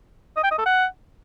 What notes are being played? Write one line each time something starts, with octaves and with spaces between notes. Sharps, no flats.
D#5
G5
D#5
A4
F#5